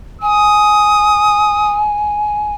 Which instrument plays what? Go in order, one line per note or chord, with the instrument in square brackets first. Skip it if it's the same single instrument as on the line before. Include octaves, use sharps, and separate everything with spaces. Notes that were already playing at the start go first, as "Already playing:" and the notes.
[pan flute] G#5 [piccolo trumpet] D#6